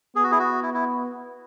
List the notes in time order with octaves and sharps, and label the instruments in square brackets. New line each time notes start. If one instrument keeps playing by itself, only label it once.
[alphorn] B3 [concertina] G#4
[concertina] F#4
E4 G#4
F#4
E4
E4